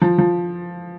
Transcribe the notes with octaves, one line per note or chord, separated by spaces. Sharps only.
F3
F3